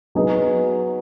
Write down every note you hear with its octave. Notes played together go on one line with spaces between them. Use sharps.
F#3 B3 D#4 G#4